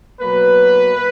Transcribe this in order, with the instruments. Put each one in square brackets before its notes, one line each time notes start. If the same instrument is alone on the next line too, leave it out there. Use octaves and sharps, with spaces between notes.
[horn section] B2 F#3 A#3 B4